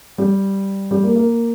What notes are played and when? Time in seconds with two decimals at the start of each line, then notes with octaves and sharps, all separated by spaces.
0.18 G3
0.91 G3
1.03 A#3
1.16 A#3